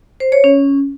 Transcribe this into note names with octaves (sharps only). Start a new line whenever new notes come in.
C5
C#5
C#4